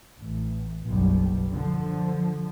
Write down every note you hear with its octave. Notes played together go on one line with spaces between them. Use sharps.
A1
F#1 B1 G3
D3 F3